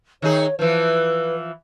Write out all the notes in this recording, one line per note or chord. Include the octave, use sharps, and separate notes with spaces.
D#3 D#4 G#4 C#5
E3 F3 B4